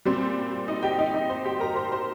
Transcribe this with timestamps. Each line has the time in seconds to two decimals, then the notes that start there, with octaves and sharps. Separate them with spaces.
0.05 A#2 G3 C4 C5
0.68 D#4 D#5
0.83 G4 G5
0.98 D#4 D#5
1.14 D#4 D#5
1.29 C5 C6
1.45 G4 G5
1.60 A#4 A#5
1.76 C5 C6
1.92 C5 C6